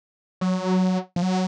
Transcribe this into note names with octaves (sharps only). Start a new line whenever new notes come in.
F#3
F3
F#3